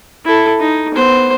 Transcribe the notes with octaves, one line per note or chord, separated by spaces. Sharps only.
E4 A4
D#4
B3 C5